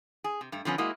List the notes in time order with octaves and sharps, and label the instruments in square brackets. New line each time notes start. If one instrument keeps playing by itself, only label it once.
[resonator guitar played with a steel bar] G#4
C3
G2 A3
D3 F3 B3 C#4
G#3 A#3 E4 F#4 D#5